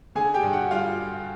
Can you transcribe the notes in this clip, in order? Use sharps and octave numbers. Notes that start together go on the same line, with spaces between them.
D3 G#4 G#5
G4 G5
G2
F#4 F#5
G3 F4 F5